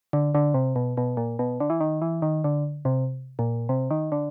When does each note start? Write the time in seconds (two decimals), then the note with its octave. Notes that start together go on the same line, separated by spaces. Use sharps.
0.13 D3
0.34 D3
0.54 C3
0.76 B2
0.97 B2
1.17 A#2
1.39 B2
1.60 D3
1.70 E3
1.80 D#3
2.02 E3
2.22 D#3
2.44 D3
2.85 C3
3.39 A#2
3.69 C3
3.91 D#3
4.12 D3